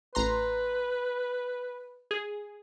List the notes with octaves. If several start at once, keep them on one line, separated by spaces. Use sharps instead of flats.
A1 B4 A#5 C6
G#4